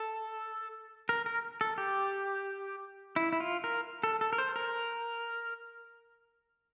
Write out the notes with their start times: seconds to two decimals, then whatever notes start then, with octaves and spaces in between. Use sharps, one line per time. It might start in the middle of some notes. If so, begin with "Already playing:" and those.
Already playing: A4
1.09 A#4
1.26 A#4
1.61 A4
1.78 G4
3.16 E4
3.33 E4
3.40 F4
3.64 A#4
4.03 A4
4.21 A4
4.33 A#4
4.38 C5
4.56 A#4